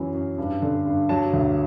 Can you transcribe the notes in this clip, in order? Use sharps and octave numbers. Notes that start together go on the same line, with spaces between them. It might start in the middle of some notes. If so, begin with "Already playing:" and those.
Already playing: F#2 E3 F#3
F#2
G2
D3
G2
F#3 A5
D2